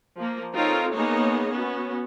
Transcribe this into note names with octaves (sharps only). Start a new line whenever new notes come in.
F3 A#3
C4 D#4 F4 A4 A#4 C#5
A#3 B3 D#4 G#4 C#5 D#5
B3 C#4 F#4